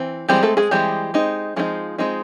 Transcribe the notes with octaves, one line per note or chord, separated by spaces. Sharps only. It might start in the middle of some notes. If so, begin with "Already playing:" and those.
Already playing: E3 C4
E3 G3 G#3 C4 G4
A3 A4
G#3 G#4
E3 G3 G#3 C4 G4
G#3 C4 D#4
F3 G#3 C4 D#4 F4
G#3 C4 D#4